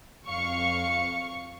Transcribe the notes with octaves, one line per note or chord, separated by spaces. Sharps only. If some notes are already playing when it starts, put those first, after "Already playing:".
F2 F5 C#6 C#7